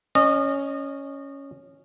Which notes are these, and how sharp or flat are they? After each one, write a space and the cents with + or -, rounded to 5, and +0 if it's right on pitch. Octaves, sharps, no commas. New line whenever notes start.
C#4 +0 D#5 -30